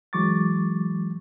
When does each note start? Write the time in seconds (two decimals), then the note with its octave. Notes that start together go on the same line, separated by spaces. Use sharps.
0.13 E3 F#3 G#3 C#6 D6 A6